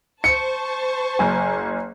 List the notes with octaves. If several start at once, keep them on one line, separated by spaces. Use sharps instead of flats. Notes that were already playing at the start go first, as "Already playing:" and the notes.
C5 A5 C#6 C#7
F#1 G#5